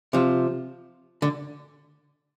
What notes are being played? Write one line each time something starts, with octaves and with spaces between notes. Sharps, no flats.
C3 F3
D3